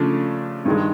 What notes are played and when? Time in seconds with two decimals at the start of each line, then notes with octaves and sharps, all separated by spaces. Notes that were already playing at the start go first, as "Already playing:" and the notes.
Already playing: C#3 F3 A3 D4
0.65 G2 D#3 G#3